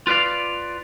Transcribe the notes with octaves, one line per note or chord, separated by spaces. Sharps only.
F4 B4 D5 F5